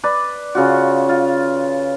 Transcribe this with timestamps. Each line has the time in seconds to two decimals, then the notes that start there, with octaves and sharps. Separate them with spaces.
0.04 B4 D5
0.55 C#3 F4 F#4
1.09 F4